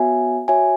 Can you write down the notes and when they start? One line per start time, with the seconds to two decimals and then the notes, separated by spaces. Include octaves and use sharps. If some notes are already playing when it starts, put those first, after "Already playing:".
Already playing: B3 F#4 C#5 E5 G#5
0.48 F#4 C#5 E5 G#5